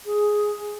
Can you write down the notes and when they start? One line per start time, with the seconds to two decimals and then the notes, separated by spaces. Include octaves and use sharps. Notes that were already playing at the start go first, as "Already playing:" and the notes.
0.05 G#4